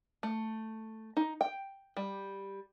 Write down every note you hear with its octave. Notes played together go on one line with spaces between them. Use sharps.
A3
D#4
G5
G3